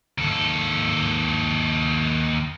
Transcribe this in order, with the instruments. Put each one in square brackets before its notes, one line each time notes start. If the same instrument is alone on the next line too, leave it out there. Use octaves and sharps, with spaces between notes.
[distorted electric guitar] D#2 A4